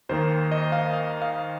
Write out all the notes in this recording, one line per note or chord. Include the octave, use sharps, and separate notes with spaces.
D#2 D#3 A#3 C5
D#5
F5
F5
F5